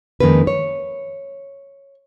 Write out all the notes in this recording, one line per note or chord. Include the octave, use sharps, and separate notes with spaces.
F2 D#3 G#3 A#3 C#4 B4
C#5